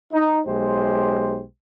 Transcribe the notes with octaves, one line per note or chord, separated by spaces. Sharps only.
D#4
B1 G#3 G4 C5